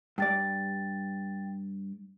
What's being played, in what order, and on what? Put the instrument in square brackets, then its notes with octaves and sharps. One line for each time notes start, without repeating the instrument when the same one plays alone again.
[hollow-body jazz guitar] G2 D5 [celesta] G5 A6